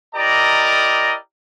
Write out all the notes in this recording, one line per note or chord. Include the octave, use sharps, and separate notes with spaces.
E4 G4 A#4 D5 D#5 A#5